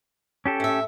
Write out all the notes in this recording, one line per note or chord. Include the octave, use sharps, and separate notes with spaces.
C#4 G4 A4
A2 E5